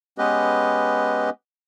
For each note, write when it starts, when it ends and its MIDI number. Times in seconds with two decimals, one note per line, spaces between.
0.18 1.30 56
0.18 1.30 59
0.18 1.30 61
0.18 1.30 67
0.18 1.30 71
0.18 1.30 75